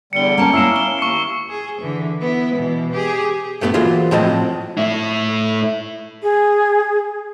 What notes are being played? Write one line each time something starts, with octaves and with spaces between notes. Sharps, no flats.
E2 D3 G3 C#7 D7 G7
A#3 C#4 A5
A#3 E4 E6 C7 E7
G7
D#2 C#6 C#7
G#4
D3 E3
B3 E4
B2 E3
G4 G#4
G2 A3 B3 F4 G4
E3 F#3 A#3 F4 G#4 C5
A2 F3 F#3 C4 D#5 A5
A2 E4
G#4